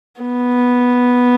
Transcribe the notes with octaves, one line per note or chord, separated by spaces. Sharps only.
B3